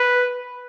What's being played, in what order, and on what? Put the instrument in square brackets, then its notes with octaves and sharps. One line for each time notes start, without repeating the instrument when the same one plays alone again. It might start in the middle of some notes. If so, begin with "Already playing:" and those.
Already playing: [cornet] B4